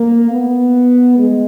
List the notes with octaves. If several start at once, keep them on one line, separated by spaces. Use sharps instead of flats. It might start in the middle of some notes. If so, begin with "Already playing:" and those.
Already playing: A#3
B3
G#3